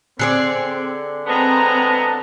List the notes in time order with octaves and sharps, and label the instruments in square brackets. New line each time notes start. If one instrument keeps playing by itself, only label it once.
[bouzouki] D3 G#4 D5 [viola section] C4
[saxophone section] G#3 B3 [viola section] C4 A#5 [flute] A5